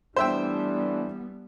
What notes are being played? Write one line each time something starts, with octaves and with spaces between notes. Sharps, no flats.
E3 G3 A3 B3 D4 C5 E5 G5